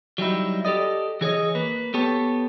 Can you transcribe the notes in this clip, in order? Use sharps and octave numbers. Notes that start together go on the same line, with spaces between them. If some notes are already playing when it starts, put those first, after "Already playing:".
F#3 G3 D#4 E4
G4 A4 D5 D#5
E3 G#4 C#5 D#5
A#3 B4
B3 G4 A4 C#5